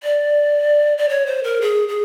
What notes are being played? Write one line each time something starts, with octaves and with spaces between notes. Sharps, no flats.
D5
D5
C#5
C5
A#4
G#4
G#4